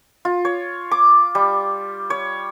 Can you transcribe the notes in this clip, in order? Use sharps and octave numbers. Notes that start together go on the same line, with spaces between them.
F4
C#5
D6
G3
C#5